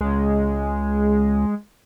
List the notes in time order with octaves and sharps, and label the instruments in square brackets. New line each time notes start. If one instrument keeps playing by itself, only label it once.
[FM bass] C#2 [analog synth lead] G#3